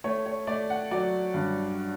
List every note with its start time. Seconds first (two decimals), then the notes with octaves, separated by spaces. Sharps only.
0.04 A3 C#5
0.26 C#5
0.47 A3 D5
0.70 F#5
0.91 F#3 D5
1.34 G2